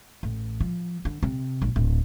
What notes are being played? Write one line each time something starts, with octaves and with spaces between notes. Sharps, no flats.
A1
F3
D3
C3
A#1
D1